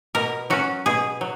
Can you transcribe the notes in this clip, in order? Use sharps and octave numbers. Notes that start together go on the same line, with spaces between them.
B2 A#4
F#3 C#4 F#4
B2 G#4
F#3